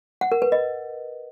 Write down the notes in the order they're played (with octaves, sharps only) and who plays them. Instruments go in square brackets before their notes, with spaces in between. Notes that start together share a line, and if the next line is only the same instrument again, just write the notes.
[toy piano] F#5
A#4
B4
D#5